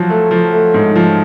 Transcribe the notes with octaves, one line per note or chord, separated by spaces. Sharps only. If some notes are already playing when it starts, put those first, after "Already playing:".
Already playing: F3 F#3
A3
F3
A3
G#2
F3